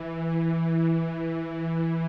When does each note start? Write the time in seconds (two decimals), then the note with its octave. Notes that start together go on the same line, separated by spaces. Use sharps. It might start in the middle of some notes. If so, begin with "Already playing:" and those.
Already playing: E3
0.23 E3